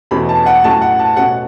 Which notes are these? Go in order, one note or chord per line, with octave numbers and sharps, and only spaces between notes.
E2 B2 A3 C#4 B5
A5
F#5
A2 F#3 A3 C#4 A5
F#5
A5
B2 A3 C#4 F#5